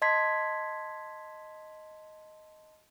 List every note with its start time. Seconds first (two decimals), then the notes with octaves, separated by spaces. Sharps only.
0.02 D#5 A5 C6 G#6 B6 C7